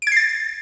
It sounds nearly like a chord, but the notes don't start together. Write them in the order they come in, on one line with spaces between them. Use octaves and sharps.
D7 G#6 C7 A6